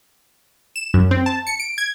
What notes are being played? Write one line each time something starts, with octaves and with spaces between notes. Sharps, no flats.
E7
F#2
C4
A5
C#7
D7
G#6